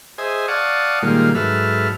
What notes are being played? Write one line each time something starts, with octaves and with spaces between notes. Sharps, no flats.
G#4 C5 D#5 E5 G#5
D5 F5 F#5 A5 C#6 D#6
A#2 D#3 G3 G#3 A#3 F4
G#2 F#3 A4 B4 E5 F6